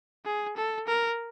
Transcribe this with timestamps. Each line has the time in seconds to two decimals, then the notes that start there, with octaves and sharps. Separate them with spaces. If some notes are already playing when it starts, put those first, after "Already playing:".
0.25 G#4
0.56 A4
0.87 A#4